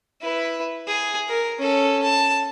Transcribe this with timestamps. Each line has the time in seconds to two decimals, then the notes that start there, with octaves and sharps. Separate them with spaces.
0.21 E4 B4
0.88 G#4
1.29 A#4
1.59 C#4 A4
2.03 A5